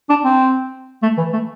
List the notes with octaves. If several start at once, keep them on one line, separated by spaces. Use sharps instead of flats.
D4
C4
A3
E3
A3